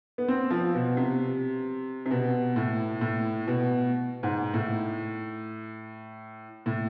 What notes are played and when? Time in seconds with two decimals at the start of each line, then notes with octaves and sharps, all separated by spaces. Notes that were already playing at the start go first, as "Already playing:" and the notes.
0.18 B3
0.28 C4
0.50 F3
0.74 B2
0.97 C3
2.06 C3
2.11 B2
2.56 A2
3.01 A2
3.48 B2
4.23 G#2
4.54 A2
6.66 A2